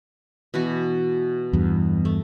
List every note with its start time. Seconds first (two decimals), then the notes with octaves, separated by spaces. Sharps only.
0.54 B2 E3 F#4
1.53 E2 G2
2.05 A3